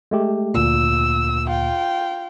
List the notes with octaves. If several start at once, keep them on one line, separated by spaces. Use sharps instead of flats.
G#3 A3 G4
D2 A#2 E6
F4 G5